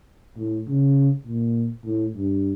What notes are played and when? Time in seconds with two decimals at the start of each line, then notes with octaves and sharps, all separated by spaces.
0.38 A2
0.67 C#3
1.26 A#2
1.84 A2
2.15 G2